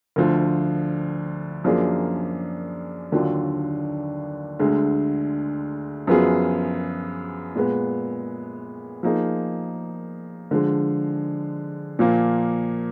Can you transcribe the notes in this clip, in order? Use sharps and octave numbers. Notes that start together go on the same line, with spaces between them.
D2 D3 F3
F#2 F3 A#3 D4 G#4
D#2 D3 F#3 D4 F4
D2 D3 G#3
F#2 F3 B3 F4 G#4
A#2 G#3 B3
F3 A#3 D#4 G#4
D3 F3 G#3
A#2 F3 A#3